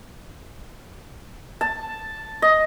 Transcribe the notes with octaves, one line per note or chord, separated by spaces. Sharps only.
A5
D#5